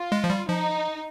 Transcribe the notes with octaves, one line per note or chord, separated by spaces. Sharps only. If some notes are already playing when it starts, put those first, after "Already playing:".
Already playing: F4
G#3
F3
G3
F3 D#4